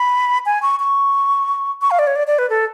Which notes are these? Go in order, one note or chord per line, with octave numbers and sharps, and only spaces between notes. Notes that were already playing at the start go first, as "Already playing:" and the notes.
Already playing: B5
G#5
C#6
C#6
C#6
F5
D5
C#5
D5
D5
B4
A4